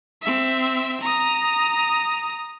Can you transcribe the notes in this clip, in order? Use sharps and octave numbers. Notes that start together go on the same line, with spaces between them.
C4 E5
A#5 D#6